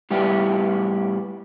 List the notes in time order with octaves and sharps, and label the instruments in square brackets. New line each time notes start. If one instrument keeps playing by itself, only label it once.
[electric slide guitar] A2 G3 B3 E4 G4